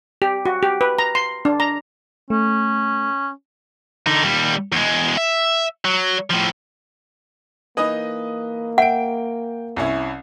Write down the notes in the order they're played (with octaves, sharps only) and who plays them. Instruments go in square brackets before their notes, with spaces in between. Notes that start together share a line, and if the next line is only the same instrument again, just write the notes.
[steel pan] G4
F#4
G4
B4
A#5
C6
D4
A#5
[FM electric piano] A3 [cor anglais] C#4
[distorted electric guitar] D3 D#4
D#2 G3
E2 G#3
E5
F#3
A2 F3
[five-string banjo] E3 D#4 [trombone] A#3 [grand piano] B4 D#5 D#6
[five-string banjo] E5 [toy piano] F#5 [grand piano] G5 D7
[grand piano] C2 C#4 E4